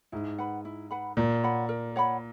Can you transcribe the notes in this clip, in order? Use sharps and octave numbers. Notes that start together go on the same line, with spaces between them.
G#2 E4
B4 F#5 B5
E4
B4 F#5 B5
A#2 A#4
C#5 F#5 B5
A#4
C#5 F#5 B5